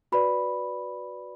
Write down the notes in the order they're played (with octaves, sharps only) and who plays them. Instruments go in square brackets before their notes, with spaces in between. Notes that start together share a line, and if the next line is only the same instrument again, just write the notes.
[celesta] F#4 B4 D5 B5